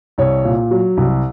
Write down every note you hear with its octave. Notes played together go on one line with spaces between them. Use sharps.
C2 C#5
A#2
F#3
C2